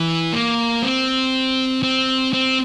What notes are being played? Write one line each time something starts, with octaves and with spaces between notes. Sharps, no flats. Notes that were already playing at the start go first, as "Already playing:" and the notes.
Already playing: E3
A#3
C4
C4
C4